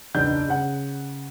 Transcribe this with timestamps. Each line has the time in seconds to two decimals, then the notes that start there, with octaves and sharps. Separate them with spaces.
0.15 F#1 B1 E2 D4 G6
0.48 C#3 F#5